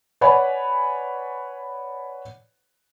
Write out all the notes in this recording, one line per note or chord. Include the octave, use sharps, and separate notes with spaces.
B4 C#5 D5 F#5 G#5 B5